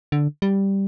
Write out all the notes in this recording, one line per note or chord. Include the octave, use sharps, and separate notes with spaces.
D3
G3